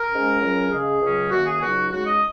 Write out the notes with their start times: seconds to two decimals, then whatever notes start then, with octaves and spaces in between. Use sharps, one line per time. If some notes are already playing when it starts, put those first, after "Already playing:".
Already playing: A#4
0.10 G#2 G#3 C#4
0.41 C#2 C#3 F#3 C#4
0.70 C#3 G#3 C#4 G#4
1.01 C#2 C#3 F#3 C#4
1.31 F#2 D#3 A#3 F#4
1.46 G#4
1.61 C#2 C#3 F#3 D#4 F#4
1.92 C#3 G#3 D#4 F#4
2.07 D#5